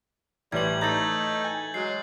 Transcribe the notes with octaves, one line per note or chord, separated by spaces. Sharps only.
A1 A2 E3 G3 G#6 F#7
A3 D#4 A#5 G6 A6 F#7
G#5
F#3 G#3 C7